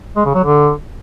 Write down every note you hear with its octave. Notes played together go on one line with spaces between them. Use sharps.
G#3
C#3
F#3
D3